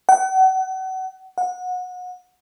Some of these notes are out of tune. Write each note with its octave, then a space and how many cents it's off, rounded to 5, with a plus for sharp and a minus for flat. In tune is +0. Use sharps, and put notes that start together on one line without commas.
F#5 +35
F#5 -25